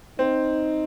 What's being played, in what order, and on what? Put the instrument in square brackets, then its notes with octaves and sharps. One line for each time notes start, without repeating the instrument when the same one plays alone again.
[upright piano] C4 [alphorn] D#4